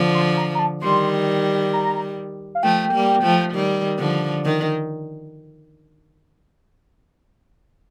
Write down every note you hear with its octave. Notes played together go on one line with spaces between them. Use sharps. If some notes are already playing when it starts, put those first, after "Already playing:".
Already playing: D3 F3
C6
A#5
A#5
A5
D#3 G3 C6
A#5
F5
F3 A3 G5
G3 A#3
F3 A3
D#3 G3
D3 F3
D#3